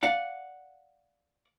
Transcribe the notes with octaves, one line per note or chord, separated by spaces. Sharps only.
D5 F5 F#5